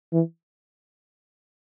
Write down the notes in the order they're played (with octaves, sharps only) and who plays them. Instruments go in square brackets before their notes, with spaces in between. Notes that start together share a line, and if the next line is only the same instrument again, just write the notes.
[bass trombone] E3